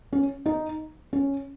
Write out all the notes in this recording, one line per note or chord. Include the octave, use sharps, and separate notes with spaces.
C#4
D#4
C#4